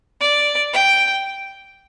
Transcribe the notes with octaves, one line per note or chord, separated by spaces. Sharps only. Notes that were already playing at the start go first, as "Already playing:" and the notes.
D5
G5